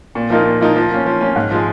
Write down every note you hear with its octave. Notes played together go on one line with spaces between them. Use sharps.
A#2
F3 A#3 D#4 A#4
A#2
F3 A#3 D#4 A#4
F3
A#3 C#4
F3
A#3 C#4
G#2
F3 G#3